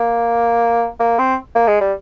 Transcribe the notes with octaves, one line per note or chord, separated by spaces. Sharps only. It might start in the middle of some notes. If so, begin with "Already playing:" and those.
Already playing: A#3
A#3
C4
A#3
G#3
G3